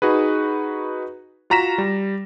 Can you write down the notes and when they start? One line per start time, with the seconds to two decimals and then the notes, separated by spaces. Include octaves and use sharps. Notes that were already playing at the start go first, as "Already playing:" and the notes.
0.02 D#4 F#4 G#4 B4
1.50 F4 F#4 A#5 A#6 B6 E7
1.78 G3